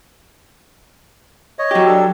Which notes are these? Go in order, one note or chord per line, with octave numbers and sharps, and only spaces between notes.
C#5 D#5
F#3 G4
D4 A4